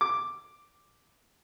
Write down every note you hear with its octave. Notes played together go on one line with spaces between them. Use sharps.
D6